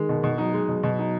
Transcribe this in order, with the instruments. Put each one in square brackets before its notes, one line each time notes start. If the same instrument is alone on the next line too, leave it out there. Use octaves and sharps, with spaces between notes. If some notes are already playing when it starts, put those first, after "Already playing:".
Already playing: [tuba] D#3 [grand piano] G#3
[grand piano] B2
B2
[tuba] F#3 [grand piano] D#4
[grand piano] G#3
B2
B2
D#4